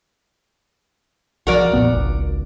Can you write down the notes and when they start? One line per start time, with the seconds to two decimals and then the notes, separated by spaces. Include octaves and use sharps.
1.47 B1 F3 F#4 A#4 D5
1.73 F2 A#2 B3
1.92 G#1 C#2